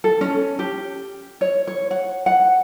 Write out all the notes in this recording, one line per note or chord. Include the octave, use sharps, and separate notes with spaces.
A4
C#4
G4
C#5
C#5
F#5
F#5